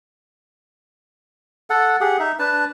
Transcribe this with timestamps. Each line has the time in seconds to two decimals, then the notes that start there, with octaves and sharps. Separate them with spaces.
1.70 A4 F#5
2.01 G4 G#4 F#5
2.20 D#4 E5
2.39 D4 B4 A5